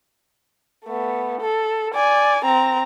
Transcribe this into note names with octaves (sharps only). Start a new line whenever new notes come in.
A3 B3
A4
D5 G#5
C4 A#5